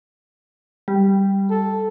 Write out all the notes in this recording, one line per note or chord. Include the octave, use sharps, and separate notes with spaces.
G3
A4